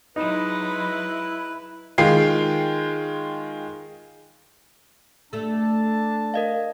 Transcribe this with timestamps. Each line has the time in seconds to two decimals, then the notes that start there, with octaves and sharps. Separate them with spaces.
0.16 F#3 G#3 D#4 E4 B4
1.98 D#3 G#3 F4 G5 C7
5.33 A3 D4 A4 A5
6.34 A#4 D#5 F5